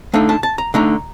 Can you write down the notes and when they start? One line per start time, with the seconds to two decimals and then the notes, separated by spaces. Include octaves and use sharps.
0.14 D3 A3 D#4 F5
0.29 A5
0.43 A5
0.58 A#5
0.74 D3 A3 D#4 A#5